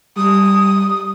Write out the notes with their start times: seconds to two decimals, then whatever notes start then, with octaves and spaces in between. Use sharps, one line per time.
0.17 G3 D#6